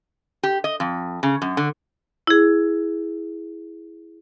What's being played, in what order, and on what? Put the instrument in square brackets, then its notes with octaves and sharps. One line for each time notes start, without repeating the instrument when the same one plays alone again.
[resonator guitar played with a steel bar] G4
D#5
F2
C#3
F#2
D3
[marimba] E4 G#4